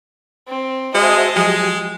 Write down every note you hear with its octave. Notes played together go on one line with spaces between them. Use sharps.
C4
G#3 F#4 C5 D#5 E5 A5
F3 F#3 G#3 G4